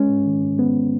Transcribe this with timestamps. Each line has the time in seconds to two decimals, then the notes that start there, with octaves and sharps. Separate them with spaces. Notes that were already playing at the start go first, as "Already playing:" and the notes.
Already playing: G#3 C#4
0.09 G#2
0.26 D#3
0.43 G#2
0.58 G#3 B3